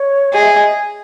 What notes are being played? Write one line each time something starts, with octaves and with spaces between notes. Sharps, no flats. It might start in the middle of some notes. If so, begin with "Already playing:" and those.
Already playing: C#5
G#4 D#5
E5
D#5